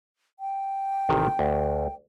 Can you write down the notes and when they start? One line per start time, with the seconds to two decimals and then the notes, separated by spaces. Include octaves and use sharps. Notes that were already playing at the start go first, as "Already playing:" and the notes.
0.40 G5
1.09 A1 C3 D#3
1.39 D2